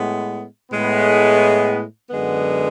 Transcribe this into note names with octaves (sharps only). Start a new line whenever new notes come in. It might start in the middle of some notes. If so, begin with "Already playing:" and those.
Already playing: A2 G#3 B3
A2 G#3 B3
F#2 D3 G#3 B3